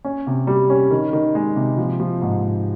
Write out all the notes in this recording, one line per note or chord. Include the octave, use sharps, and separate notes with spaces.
C#4
C3
G3
C#4
D#3
D#3
G#3
C3
F3
F3
G#2
G#2